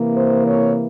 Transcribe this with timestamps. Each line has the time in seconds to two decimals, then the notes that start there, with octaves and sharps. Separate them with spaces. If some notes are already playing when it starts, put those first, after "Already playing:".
Already playing: C3 E3 A#3
0.15 C5
0.45 C#5